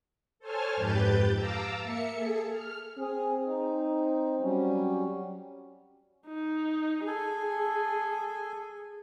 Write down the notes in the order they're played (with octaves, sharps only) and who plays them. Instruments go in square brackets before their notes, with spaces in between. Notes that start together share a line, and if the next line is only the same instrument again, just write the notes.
[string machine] A4 C5 C#5 G#5 A5 F6
F2 G#2 G4 B4 G6 A6
F5 A5 A#5 D6 E6
A#3 E5 C#7
G#4 A4
F6
[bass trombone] C4 [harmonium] G#4
[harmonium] D#4
F#3 G3 C#4
[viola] D#4
[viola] G#4 [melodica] A4 G#5